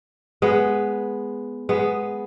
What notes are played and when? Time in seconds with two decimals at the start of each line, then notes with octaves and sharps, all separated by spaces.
0.42 G#3 B3
1.69 G#3 B3